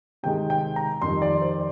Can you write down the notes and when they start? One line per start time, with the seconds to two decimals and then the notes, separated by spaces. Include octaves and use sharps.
0.23 C3 D#3 G#3 G5
0.50 G5
0.76 A#5
1.02 F2 D#3 G3 C6
1.22 D5
1.42 C5